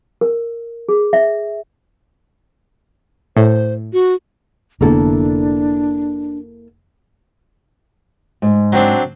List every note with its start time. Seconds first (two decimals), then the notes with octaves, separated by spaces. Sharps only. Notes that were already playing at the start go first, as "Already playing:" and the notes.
0.21 A#4
0.89 G#4
1.13 E5
3.37 A2 C5
3.93 F#4
4.81 F1 D3 A#3 B3 D4 E4 A4
8.42 G#2
8.73 F#3 C4 D4